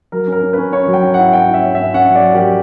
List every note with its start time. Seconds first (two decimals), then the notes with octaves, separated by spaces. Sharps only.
0.12 F#3 A#4
0.27 C#4
0.32 A#4
0.43 C#4
0.53 C#4 B4
0.72 C#4 C#5
0.87 F#3
0.93 G5
1.03 C#4
1.14 E4 F#5
1.33 C#4 G5
1.49 E4 E5
1.63 C#4
1.75 C#4 E5
1.94 C#4 F#5
2.10 F#3
2.15 D5
2.25 F#3
2.31 A#4
2.35 G4
2.40 F#3